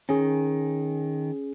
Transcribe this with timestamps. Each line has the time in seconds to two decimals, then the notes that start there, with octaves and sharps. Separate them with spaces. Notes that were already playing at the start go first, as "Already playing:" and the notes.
0.09 D#3 C#4 G#4